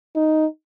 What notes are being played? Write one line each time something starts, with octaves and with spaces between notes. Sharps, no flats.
D#4